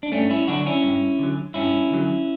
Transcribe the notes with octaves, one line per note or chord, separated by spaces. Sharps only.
D4
G2 A3 C#4
C#4 E4
D3 F#3 D4 F#4
C#4 E4
G2
D3 F#3
G2 C#4 E4
D3 F#3